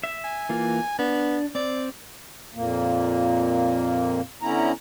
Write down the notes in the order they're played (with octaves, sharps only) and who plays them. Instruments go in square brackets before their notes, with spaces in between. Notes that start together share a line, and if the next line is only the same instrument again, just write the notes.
[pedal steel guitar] E5
[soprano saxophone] G#5
[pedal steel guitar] E3 A#3 F4
[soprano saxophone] B3 [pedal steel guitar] D4
[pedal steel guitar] C4 [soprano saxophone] D5
[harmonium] F2 A#2 A#3
D3 B3 C#4 E4 A#5